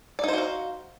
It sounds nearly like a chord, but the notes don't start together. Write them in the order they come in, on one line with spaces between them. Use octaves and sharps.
D5 D#4 C5 F#4 F5